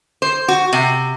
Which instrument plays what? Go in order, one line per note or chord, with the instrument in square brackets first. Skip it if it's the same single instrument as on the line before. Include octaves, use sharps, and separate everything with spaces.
[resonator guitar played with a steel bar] C5
F#4
C3